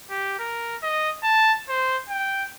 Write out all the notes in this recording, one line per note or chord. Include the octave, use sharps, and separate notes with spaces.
G4
A#4
D#5
A5
C5
G5